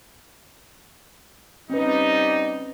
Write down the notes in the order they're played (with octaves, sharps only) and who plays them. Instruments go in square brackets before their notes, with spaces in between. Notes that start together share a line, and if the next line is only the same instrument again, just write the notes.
[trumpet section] G3 D#4 [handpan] C4 C#4 B4